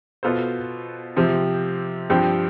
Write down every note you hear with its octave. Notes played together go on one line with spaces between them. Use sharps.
B2 B3 F4 A4 C5
C3 F3 C4 G4
G2 F3 C4 G4